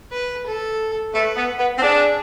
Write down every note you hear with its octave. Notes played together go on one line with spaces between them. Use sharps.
B4
A4
A3 B4
B3
B3
C4
D4 G#4